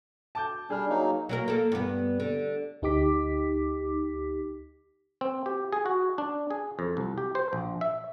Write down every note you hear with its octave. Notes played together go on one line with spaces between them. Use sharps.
A5 D6 G6
G3 D4 G#4 F6
F#3 A#3 D#4
F#3 A#3 A#4
A#3 A4
G2 B3
D3
D2 D#4 G4 D6 B6
C4
G4
G#4
F#4
D4
G#4
F2
C2
G4
C5
A#1
E5